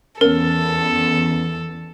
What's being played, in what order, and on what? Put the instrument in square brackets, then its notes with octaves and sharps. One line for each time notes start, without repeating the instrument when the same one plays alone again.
[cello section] E2 [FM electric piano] B3 C#4 [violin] A4 [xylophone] A#4